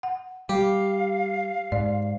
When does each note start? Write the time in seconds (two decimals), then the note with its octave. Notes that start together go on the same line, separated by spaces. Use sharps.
0.03 F#5
0.49 G3 G4 F5
1.72 G#2 D5